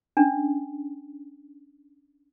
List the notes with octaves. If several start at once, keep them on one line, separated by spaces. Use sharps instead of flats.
C#4 D4